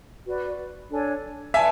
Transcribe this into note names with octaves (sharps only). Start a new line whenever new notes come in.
F#4 B4 D5
D4 A4 C#5 G#5
B4 D5 E5 G#5 A5